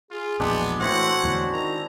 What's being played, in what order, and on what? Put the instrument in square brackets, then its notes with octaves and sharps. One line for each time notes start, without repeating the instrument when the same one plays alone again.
[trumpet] F4 [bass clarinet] G#4
[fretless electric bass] A#1 E2 B2 [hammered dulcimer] G#3 D4 G4 [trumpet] B3
[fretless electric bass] A2 E3 [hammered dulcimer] C4 E4 [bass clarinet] F#4 [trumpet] F#5
[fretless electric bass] E2 A2 D3
[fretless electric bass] D#3 [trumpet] A#5